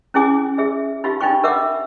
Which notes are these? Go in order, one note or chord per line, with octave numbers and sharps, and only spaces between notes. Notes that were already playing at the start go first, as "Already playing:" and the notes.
C#4 E4 G#4 G#5 D6
G#4 E5
D#4 F4 G4 F5
D4 D#4 F4 G5 C#6
A#4 E5 F#5 D6